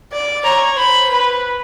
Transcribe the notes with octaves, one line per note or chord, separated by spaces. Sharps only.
D5
C#5 A#5
C5 B5
B4